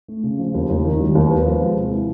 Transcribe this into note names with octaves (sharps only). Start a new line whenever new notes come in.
A3
C#3
F3
D#2
D#2
D#3
G3
D#2
B3
F3
G#3
C3
E4